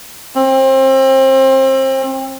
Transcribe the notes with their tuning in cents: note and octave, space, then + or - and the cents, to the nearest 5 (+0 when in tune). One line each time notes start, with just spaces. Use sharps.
C4 +30